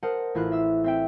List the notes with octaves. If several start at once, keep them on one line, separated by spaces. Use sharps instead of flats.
A#4 C5 D#5 F#5 A5
A1 E4 F4 F#6
E5 E6
C4 E5 G5